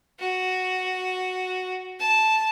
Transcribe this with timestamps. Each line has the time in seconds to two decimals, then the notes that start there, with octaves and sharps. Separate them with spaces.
0.20 F#4
2.00 A5